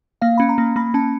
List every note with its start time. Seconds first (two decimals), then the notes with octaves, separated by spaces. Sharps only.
0.22 A#3 F5
0.38 C#4 B5
0.49 A#5
0.58 A#3
0.76 A#3 B5
0.94 C#4 A5